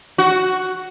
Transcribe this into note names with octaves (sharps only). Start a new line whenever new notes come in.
F#4